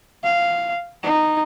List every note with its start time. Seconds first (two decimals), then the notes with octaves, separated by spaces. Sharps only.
0.24 F5
1.03 D#4